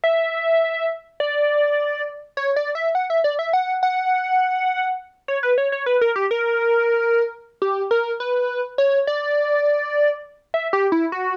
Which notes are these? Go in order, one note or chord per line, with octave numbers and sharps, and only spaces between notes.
E5
D5
C#5
D5
E5
F#5
E5
D5
E5
F#5
F#5
C#5
B4
C#5
C#5
B4
A#4
G4
A#4
G4
A#4
B4
C#5
D5
E5
G4
E4
F#4